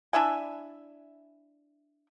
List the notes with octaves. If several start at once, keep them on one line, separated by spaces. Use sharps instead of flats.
D4 E4 E5 G#5